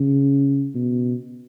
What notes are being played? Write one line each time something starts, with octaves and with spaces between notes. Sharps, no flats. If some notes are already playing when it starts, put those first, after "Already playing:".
Already playing: C#3
B2